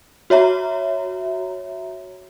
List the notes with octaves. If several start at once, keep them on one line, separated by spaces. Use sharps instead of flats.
F#4 C#5 E5 A#5